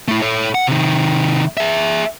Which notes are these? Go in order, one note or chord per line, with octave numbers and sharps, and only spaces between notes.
A3 E4
A4 C#5
F#5
C3 D#3
G#4 E5